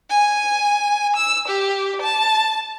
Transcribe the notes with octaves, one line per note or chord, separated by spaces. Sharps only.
G#5
E6
G4
A5